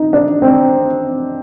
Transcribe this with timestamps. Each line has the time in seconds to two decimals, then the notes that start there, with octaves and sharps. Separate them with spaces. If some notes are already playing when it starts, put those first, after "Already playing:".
Already playing: D#4
0.13 D4
0.42 C4